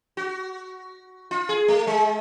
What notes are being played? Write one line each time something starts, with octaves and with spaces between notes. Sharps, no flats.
F#4
F4
G#4
A3
G#3